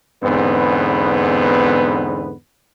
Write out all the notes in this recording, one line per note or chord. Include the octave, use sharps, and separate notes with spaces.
E2 G#2 D3 B3 C4 B4